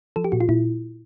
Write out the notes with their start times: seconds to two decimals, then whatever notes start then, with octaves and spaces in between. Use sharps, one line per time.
0.16 F3 A4
0.24 G4
0.32 A#2 F#4
0.40 F4
0.49 A#2 E4